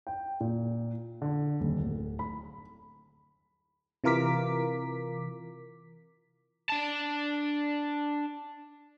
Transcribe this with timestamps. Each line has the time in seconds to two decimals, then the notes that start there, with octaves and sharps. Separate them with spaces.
0.07 G5
0.40 A#2
1.22 D3
1.60 D#1
1.80 D1
2.19 B5
4.04 C3 E3 F4 A#4 D6 B6
6.69 D4 A5